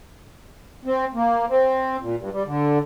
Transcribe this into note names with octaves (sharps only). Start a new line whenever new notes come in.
C4
A#3
C4
A#2
G2
G3
D3